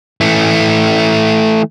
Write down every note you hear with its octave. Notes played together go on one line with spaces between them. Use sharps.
E3 A3